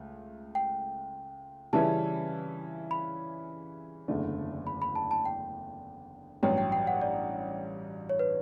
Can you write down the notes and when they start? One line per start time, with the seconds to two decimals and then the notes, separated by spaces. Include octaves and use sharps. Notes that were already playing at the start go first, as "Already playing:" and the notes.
Already playing: C#2 A3
0.55 G5
1.73 C#3 E3 G3 C#4 E4 A5
2.91 B5
4.08 F#1 E2 D3 A3 D4
4.67 B5
4.82 B5
4.96 A5
5.11 A5
5.25 G5
6.43 A1 G2 F#3 G5
6.58 G5
6.72 G5
6.87 F#5
7.01 D5
8.09 C#5
8.19 B4